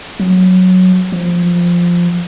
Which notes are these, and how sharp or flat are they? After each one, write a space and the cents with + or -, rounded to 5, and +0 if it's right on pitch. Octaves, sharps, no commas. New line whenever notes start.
F#3 -5
F3 +0